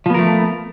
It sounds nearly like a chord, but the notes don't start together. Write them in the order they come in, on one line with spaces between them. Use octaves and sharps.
F3 B3 A#4 A3